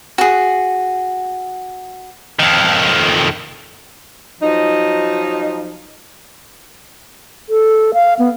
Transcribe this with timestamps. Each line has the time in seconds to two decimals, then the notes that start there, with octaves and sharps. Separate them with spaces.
0.18 F#4 G#4
2.39 F2 D#3
4.41 F3 F#3 D#4
7.49 A4
7.94 F5
8.19 B3